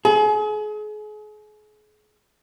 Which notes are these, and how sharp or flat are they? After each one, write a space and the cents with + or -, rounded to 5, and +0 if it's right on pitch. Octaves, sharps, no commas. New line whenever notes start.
G#4 +35